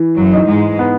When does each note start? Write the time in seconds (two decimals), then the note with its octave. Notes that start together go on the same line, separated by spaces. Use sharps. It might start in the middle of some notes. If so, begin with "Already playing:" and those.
Already playing: E3
0.17 F#2 F#3
0.33 D#4
0.48 G#2 G#3
0.79 B3